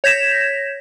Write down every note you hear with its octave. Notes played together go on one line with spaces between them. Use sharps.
C#5 G6 G#6 A#6 B6 E7